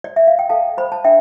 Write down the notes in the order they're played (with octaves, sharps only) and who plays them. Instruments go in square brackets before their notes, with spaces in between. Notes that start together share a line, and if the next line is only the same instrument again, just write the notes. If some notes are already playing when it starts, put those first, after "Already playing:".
[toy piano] D5
E5
F5
G5
A4 F5 A5
C5 B5
A5
D4 E5 G5